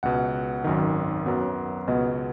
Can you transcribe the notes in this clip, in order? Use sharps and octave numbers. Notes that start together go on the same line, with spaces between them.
C#2 B2 B3 F#5
G#1 F#2 D#3
F#2 F#3 B3
C#2 B2 B3 D#5